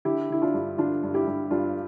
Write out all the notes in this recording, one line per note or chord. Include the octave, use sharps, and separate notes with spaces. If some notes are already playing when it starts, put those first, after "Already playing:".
D3 E4 G4
D3 E4
D4 F4
G2
D3 D4 F4
G2
E4 G4
G2
G2 D4 F4